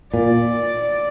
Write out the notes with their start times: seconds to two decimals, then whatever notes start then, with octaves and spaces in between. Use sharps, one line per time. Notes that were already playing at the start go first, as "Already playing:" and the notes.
0.14 A#2 D5